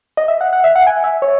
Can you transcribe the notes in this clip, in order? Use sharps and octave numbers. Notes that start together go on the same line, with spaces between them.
D#5
E5
F#5
F#5
E5
F#5
G#5
E5
C#5